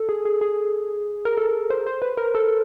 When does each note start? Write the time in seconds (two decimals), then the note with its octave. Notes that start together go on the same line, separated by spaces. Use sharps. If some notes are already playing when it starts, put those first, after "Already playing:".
Already playing: A4
0.09 G#4
0.25 G#4
0.41 G#4
1.25 A#4
1.37 A4
1.70 C5
1.86 C5
2.02 B4
2.17 A#4
2.35 A4